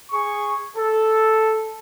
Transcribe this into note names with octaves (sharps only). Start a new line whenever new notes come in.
G#4 C#6
A4